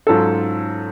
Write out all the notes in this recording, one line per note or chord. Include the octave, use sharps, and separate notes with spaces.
G#2 F#3 C#4 F4 A4